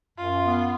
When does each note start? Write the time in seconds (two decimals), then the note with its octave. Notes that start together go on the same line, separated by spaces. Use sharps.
0.18 F#2 F4
0.45 B3